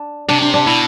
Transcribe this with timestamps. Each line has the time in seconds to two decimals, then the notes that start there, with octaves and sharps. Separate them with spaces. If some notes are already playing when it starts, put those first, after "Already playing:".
Already playing: D4
0.28 C3 D4
0.41 D4
0.54 D4
0.67 B2 E4